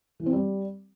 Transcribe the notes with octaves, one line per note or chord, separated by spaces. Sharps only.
E3
C4
G3